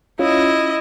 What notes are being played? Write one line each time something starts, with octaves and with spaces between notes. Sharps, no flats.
C#4 E4 F4 D#5